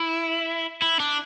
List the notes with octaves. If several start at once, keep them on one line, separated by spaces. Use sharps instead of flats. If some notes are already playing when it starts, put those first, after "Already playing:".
Already playing: E4
E4
D4